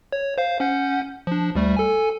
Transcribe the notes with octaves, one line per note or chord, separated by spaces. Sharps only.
C#5
C5 F5
C#4 F#5 G6
F3 D4
D2 G3 A3
A4 G#5